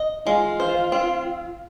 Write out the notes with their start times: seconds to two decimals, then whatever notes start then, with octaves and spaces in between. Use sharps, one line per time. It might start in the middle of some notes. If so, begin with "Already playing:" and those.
Already playing: D#5
0.26 G#3 F4
0.60 C5
0.92 C4